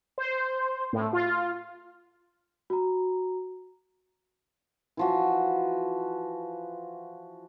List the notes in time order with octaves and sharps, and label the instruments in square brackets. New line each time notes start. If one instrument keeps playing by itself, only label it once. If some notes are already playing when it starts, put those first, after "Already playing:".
[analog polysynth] C5
A2
F4
[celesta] F#4 A#5
[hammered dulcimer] E3 F3 F#4